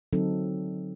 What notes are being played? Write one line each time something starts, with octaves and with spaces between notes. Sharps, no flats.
D3 F#3 C4 D#4 A4